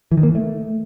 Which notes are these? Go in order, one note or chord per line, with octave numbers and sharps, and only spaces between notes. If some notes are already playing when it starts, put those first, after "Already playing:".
E3
D#3
A#3
E3
A3